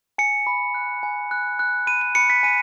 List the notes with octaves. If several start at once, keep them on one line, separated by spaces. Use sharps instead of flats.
G#5 C#7
B5
F#6
G#5
F#6
F#6
B5 D#7
D#7
B5 C#7
B6
G#5 D#7